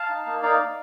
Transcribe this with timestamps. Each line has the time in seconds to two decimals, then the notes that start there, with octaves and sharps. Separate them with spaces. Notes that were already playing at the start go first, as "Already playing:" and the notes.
Already playing: F5 A5
0.09 D#4
0.26 A#3
0.42 D#4 D5 F5
0.59 D#4